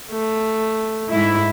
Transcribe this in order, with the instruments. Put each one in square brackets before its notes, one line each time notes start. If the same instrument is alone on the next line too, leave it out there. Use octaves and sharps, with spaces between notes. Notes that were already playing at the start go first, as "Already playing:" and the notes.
[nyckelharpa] A3
[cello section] G#2 E4